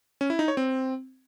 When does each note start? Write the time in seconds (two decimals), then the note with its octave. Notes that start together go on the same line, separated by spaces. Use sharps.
0.21 C#4
0.30 E4
0.39 D#4
0.48 C#5
0.57 C4